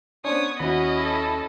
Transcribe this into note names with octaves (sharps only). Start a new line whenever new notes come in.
B3 C#4 D4 C5 C#5 D#6
D#2 C#4 E4 F#4 D#5 B5
A4